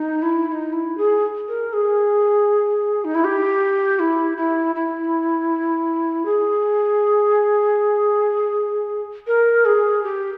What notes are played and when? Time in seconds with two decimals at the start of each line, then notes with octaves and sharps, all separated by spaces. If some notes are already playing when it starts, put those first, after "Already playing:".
Already playing: D#4
0.22 E4
0.48 E4
0.52 D#4
0.73 E4
0.98 G#4
1.48 A#4
1.73 G#4
3.05 D#4
3.15 E4
3.24 G4
3.99 E4
4.37 E4
4.75 E4
6.25 G#4
9.27 A#4
9.65 G#4
10.03 G4